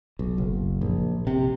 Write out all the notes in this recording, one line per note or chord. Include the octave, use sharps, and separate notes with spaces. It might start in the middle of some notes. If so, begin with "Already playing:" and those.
B1
F#1
A#1
C3